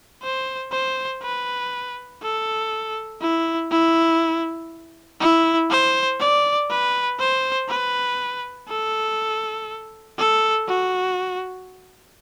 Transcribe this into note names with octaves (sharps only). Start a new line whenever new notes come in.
C5
C5
B4
A4
E4
E4
E4
C5
D5
B4
C5
B4
A4
A4
F#4